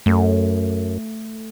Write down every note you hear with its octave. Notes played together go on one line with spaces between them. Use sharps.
F#2 A3